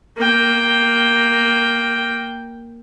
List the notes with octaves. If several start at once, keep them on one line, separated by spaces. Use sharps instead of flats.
A#3 G5